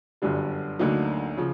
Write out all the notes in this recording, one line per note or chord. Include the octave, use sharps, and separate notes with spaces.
G1 F#2 D3 G3
D2 D3 F#3 A#3 D#4
C#3 F3